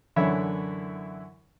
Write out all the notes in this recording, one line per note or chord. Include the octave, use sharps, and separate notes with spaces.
F#2 D3 E3 E4 C#5 E5